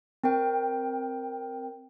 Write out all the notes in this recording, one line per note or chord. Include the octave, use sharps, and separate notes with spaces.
C4 A#4 G5